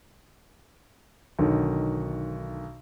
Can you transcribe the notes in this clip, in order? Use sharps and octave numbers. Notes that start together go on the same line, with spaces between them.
B1 D3 D#3